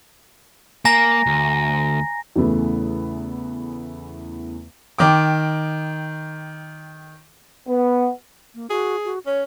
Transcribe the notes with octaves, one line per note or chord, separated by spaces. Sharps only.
A#3 G#5 A#5 A#6
D2
E2 C#3 E3 A3 B3
D#3 G5 D6
B3
A#3
F#4 G#4
F#4
C#4 C#5